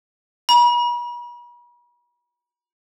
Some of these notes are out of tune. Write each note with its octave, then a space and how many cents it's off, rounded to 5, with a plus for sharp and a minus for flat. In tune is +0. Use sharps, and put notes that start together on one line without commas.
B5 -45